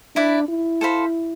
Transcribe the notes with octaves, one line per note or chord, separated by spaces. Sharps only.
D4 E4 B4 D5
E4
A4 C5 F5 B5